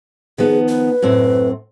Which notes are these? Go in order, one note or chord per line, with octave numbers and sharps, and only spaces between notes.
D#3 F3 B3 G#4
B4
F#2 A2 C4